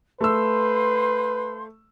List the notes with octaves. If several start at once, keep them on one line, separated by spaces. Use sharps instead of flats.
A3 B4 C5 F5 C6 E6